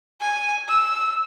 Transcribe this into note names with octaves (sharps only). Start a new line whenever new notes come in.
G#5
E6